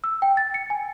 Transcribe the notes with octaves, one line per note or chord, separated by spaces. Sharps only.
E6
G5
A6
C#7
G#5